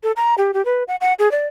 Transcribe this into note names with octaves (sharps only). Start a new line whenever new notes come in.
A4
A#5
G4
G4
B4
F#5
F#5
G#4
D5